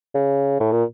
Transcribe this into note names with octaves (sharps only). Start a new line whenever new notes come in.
C#3
A2
A#2